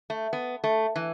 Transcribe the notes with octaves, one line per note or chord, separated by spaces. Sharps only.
A3
B3
A3
E3